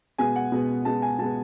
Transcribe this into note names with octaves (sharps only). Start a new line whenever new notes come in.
B2 G#3 B3 G#5
F#5
B2 G#3 B3
B2 G#3 B3 A5
G#5
B2 G#3 B3 A5